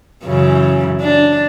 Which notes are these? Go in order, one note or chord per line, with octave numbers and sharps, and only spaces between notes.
F#2 C#3 E3
D4